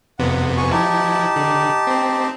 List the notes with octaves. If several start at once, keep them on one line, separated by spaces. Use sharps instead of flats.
F2 C3 B3 F#5
F#4 G#5 C#6
F3 D#4 E4 G4 A5
D3
C4